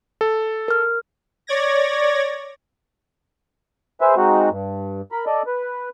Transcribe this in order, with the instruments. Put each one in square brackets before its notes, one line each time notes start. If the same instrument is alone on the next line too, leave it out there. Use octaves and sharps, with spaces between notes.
[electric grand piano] A4
[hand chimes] A#4 F6
[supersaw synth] C#5 D5 G#6 A#6
[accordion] G#4 B4 C5 E5
G#3 C4 D#4 F#4
G2
A#4 B5
A4 D5 D#5
B4